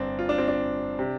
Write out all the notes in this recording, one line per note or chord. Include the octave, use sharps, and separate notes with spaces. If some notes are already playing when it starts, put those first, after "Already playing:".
Already playing: G1 C4 D4
F4
D4
C4
D4
C3